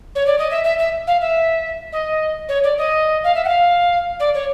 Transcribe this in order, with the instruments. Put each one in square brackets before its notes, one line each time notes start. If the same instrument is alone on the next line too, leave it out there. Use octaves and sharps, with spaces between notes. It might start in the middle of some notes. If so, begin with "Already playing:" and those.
[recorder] C#5
D5
D#5
E5
E5
E5
F5
E5
D#5
C#5
D5
D#5
F5
E5
F#5
F5
D5
C#5